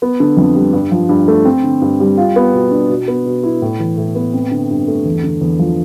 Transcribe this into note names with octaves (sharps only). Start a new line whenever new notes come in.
B3
D3
F2
G3
G2
F3
G2
A3
C4
D3
G2
G3
F4
B3
B2
D4
B2
B3
B2
E4
A2
E3
A2
B3
C4
D3
G2
A3
E2
D3
E2
F3